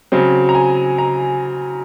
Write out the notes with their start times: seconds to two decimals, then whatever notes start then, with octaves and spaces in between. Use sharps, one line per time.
0.12 C#3 F#3 C4
0.49 A#5
0.55 G#5
0.98 A#5